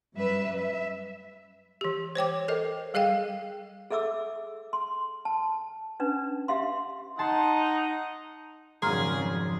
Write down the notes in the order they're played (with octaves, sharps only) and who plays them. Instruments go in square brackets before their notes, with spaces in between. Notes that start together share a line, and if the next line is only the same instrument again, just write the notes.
[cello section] F#2 G3 B4 E5
E5
[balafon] E3 G4
C5 C#5 G5 D6
A4 A#4 D#5
G3 G#4 D#5 F5 G5
[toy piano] G#4 A4 E5 D6 E6
C6
A5
C#4 D4 B4
G4 E5 F5 C6
[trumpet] D#4 [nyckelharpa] F#5 [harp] A5 C6
[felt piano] G#1 F#3 [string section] F2 C#3 [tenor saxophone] G#4 [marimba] A#5 C6 F6